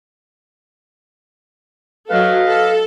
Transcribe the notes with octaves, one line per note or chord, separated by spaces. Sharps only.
F#3 A4 B4 D#5 F5
A4